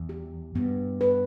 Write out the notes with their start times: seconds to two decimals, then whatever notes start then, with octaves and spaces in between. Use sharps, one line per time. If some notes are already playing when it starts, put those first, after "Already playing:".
Already playing: E2
0.09 G4
0.55 G2 B3
1.01 B4